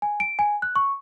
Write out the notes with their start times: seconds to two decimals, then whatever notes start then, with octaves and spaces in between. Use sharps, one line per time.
0.02 G#5
0.20 D7
0.39 G#5
0.62 F#6
0.76 C#6